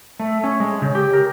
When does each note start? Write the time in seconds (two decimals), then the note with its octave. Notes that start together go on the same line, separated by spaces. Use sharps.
0.20 A3
0.44 C#4
0.60 G#3
0.82 C#3
0.95 G4
1.13 A#4